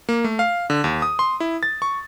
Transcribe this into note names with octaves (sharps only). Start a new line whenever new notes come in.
A#3
A3
F5
D3
D#2
D#6
C6
E4
A6
C#6